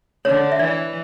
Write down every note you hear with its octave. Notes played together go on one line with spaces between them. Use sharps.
D3 C#5
E5
E3 D5